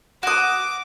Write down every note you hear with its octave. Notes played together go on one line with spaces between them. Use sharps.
F#4 D6 D#6